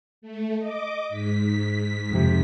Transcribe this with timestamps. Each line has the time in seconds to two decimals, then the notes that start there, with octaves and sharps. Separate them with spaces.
0.22 A3
0.58 D#5 D6
1.09 G#2 B6
2.11 F2 C3